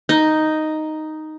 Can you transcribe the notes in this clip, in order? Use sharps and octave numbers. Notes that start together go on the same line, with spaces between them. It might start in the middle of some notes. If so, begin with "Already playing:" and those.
D#4